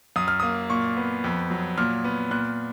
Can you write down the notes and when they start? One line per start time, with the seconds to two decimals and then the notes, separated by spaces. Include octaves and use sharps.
0.16 F#2 D#6
0.28 F6
0.40 A#3 D#6
0.70 A#2 C#6
0.97 B3
1.24 F2
1.50 F#3
1.78 A#2 F6
2.04 B3
2.31 A#2 F#6